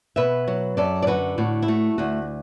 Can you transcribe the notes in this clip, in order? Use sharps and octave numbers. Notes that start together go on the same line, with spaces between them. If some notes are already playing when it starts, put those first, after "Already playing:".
B2 B4 E5
F#3
F#2 A4 D5
D5
D3 F#4 B4
A2 F#4
E4
A3 F#4
D2 F#4